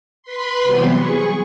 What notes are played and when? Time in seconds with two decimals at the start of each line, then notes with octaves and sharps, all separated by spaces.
0.23 B4 B5 C6
0.63 C3 E3 F#3 G3 B3
0.96 G#4 C#6